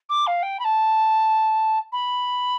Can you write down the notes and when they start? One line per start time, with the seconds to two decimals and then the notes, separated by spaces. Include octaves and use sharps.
0.09 D6
0.27 F5
0.42 G5
0.59 B5
0.64 A5
1.92 B5